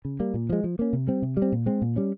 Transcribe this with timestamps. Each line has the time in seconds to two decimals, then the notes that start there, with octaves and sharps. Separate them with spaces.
0.05 C#3
0.20 G3 A#3
0.34 A#2
0.49 F3 G#3
0.64 F3
0.79 A#3 C#4
0.93 C3
1.07 G3 C4
1.22 C3
1.37 G3
1.42 C4
1.52 A#2
1.66 G#3 C4
1.82 A#2
1.96 G3 C#4